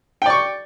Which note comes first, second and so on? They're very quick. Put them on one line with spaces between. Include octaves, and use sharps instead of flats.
G5 D5 C#6